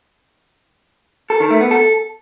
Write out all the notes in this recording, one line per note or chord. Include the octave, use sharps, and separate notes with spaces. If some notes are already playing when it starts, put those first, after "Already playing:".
A4
D#3
A3
B3
A4